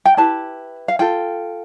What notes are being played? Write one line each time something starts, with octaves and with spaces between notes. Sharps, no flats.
G5
E4 G4 B4 A5
F5
F4 A4 G5